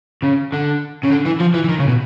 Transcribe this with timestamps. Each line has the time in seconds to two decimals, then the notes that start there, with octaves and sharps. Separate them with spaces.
0.24 C#3
0.54 D3
1.05 C#3
1.11 D3
1.26 E3
1.41 F3
1.54 E3
1.64 E3
1.69 D#3
1.79 C#3
1.88 B2